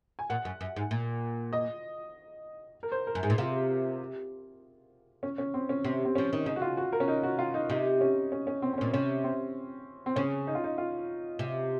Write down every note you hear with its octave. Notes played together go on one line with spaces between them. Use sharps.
G#5
A#2 F#5
F#2
F#2
G#2
A#2
D#5
A#4
C5
A#4
F#2
G#2 G#4
A#2
C3 F4
C#4
C#4
C4
C#4
C3 C4
C4
F3 C#4
D#3
C#3 D#4
F#4
F4
F#4
A#4
C#4
D#4
F#4
F4
D#4
C3 D#4
C#4
C#4
C#4
C4
C4
C#4
A#2
C3 C#4
C4
C4
C#3 C#4
D#4
F4
D#4
F4
C3